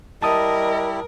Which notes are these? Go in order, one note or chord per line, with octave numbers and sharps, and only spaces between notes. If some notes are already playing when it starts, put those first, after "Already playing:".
G3 E4 A#4 D#5 A5 D#6